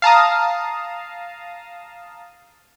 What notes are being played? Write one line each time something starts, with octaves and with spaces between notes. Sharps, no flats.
F5 A5 A#5 D#6